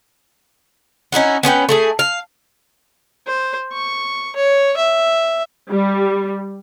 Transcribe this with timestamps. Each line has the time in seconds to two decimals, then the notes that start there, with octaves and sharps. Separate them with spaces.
1.12 C#4 D#4 E4 F#4
1.43 B3 C#4 B4 G5
1.69 A3 E4 G#4
1.99 F5
3.27 C5
3.73 C#6
4.36 C#5
4.77 E5
5.70 G3